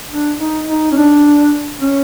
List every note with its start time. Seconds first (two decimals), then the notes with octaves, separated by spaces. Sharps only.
0.11 D4
0.39 D#4
0.68 D#4
0.92 C#4
0.97 D4
1.81 C#4